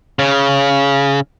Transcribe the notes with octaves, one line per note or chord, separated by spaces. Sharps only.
C#3